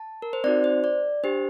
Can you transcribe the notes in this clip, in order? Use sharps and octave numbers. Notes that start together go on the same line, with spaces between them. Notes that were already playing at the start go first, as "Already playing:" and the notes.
Already playing: A5
A#4
C5
C4 D#4 F#4 D5
C5
D5
D4 G4 C5